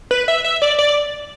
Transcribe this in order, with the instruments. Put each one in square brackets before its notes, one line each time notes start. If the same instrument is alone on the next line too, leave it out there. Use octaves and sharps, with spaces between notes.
[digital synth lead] B4
E5
E5
D5
D5